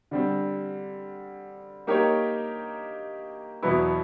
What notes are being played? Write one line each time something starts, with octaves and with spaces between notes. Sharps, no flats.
D3 G3 C4
A#3 D#4 G4 A#4 C#5
E2 B2 F#3 B3 E4